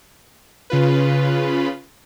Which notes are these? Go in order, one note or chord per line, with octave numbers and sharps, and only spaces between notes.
C#3 F4 B4